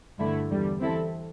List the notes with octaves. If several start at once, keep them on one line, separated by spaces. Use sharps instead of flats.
G2 D3 A3 E4
E2 D3 G3
E3 C4 E4 A4